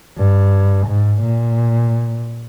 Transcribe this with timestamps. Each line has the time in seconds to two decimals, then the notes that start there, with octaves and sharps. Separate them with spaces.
0.17 G2
0.87 G#2
1.22 A#2